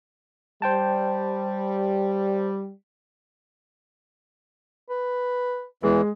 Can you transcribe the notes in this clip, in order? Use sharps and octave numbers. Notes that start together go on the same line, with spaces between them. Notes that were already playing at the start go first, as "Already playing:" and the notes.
G3 C5 G5 A5
B4
E2 E3 G#3